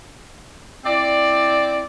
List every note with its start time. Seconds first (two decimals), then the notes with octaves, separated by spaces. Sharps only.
0.86 C4 E4 D5